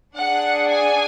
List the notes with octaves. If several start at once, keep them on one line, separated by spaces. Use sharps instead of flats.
D4 G#4 F#5
G#5